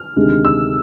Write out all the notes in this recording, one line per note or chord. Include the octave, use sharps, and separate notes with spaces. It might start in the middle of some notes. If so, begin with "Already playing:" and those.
Already playing: F6
D2 C3 D#3 G#3
E6